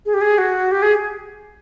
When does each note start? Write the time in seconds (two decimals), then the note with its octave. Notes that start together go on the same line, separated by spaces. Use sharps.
0.06 G#4
0.14 G4
0.21 G#4
0.38 F#4
0.71 G4
0.82 G#4